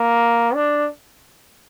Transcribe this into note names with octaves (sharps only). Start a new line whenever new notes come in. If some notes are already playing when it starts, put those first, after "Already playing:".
Already playing: A#3
D4